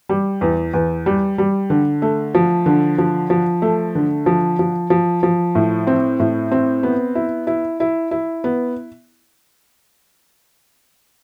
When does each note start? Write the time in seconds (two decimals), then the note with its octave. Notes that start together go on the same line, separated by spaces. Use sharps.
0.09 G3
0.41 E2
0.74 E2
1.06 G3
1.38 G3
1.70 D3
2.02 A3
2.34 F3
2.66 D3
2.98 F3
3.30 F3
3.62 A3
3.95 D3
4.26 F3
4.59 F3
4.90 F3
5.23 F3
5.55 A2
5.87 C4
6.20 A2
6.52 C4
6.83 B3
7.15 E4
7.47 E4
7.80 E4
8.11 E4
8.44 B3